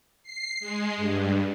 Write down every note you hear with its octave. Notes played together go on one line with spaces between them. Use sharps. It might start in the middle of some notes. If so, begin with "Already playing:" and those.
C7
G#3
G2